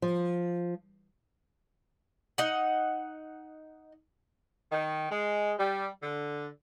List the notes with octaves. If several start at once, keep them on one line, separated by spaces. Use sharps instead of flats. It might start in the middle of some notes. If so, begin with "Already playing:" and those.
F3
D#4 F#5
D#3
G#3
G3
D3